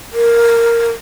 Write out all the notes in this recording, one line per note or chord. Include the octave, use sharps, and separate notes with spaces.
A#4